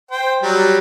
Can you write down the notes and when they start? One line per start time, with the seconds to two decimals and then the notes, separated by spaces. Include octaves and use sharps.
0.11 C5 G5
0.42 F#3 G3